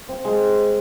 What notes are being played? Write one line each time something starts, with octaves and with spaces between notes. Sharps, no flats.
C4
G#3